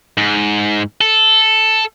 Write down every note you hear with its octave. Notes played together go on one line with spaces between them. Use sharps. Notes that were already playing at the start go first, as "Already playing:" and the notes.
G#2
A4